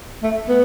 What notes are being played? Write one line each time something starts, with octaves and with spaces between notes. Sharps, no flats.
A3
B3